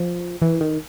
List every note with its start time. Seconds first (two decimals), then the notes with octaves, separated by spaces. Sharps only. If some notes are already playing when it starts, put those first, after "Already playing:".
Already playing: F3
0.42 E3
0.61 D#3